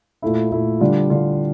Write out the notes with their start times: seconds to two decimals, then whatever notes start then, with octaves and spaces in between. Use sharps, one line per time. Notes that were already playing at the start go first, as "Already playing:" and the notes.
0.22 A#2 A3 E4
0.51 A#2 A3 E4
0.80 D3 G3 D4 F4
1.10 D3 G3 D4 F4